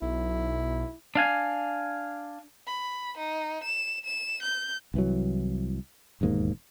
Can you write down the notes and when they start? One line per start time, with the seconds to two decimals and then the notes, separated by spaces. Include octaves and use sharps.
0.02 B1 E4
1.15 D4 F5 G#5
2.67 B5
3.18 D#4
3.64 E7
4.05 E7
4.42 G6
4.94 C2 E3 F#3
6.21 E1 D#2 G#2 A#3